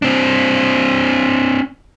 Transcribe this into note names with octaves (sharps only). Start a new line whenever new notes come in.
C4 D4